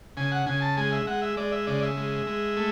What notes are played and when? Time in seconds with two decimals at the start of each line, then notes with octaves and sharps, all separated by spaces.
0.17 C#3 G#5
0.32 F#5
0.47 C#3 G#5
0.62 A5
0.77 G#3 G#5
0.92 E5
1.07 G#3 F#5
1.22 E5
1.37 G#3 D5
1.52 E5
1.67 C#3 D5
1.82 E5
1.97 G#3
2.27 G#3
2.57 A3